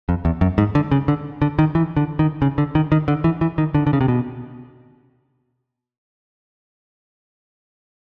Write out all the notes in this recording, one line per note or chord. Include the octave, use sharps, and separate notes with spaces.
F2
E2
F#2
G#2
D3
C#3
D3
D3
D#3
E3
D3
D#3
C#3
D3
D#3
D#3
D3
E3
E3
D#3
D3
D3
C#3
C3
B2